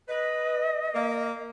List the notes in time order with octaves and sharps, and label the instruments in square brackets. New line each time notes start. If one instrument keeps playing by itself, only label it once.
[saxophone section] B4 [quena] D#5
[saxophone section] A#3